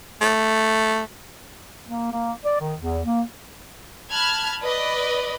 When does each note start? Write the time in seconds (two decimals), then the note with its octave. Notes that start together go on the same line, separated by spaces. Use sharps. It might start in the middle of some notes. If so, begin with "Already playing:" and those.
0.21 A3
1.89 A#3
2.12 A#3
2.44 D5
2.60 D#3
2.80 E2
3.05 A#3
4.11 A5 B5 F6 F#6 G#6
4.62 B4 D5 D#5